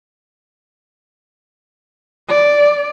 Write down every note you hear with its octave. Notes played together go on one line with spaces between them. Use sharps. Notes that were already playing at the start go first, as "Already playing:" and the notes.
D5